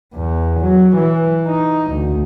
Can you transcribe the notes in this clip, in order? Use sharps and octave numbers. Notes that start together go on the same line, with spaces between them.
E2
F#3
E3
D#4
D2